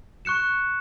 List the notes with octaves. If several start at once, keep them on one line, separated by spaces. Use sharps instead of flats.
C#6 F#6 C#7 E7